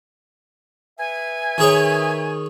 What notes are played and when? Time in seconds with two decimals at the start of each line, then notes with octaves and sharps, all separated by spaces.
0.99 B4 E5 G#5
1.58 D#3 G#4 C#5